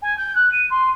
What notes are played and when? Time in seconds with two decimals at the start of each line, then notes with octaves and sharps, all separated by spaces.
0.02 G#5
0.17 G6
0.35 F#6
0.52 D#7
0.70 C6